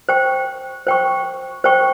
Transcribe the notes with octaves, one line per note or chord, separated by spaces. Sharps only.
C5 G5 C#6
C5 G5 C#6
C5 G5 C#6